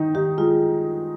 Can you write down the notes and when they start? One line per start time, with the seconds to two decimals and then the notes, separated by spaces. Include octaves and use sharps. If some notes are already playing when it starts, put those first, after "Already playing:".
Already playing: D#3 D#4
0.15 D#3 G4
0.38 G#3 F4